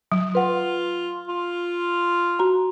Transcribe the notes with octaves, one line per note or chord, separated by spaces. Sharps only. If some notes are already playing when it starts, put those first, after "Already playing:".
F#3
F4 B4 F#5
F4
F#4 A#5